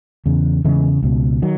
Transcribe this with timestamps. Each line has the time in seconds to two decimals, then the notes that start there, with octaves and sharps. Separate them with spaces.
0.26 E2 C#3
0.64 E2 C#3 E3 G#3
1.03 C#2 B2
1.42 D#3 F#3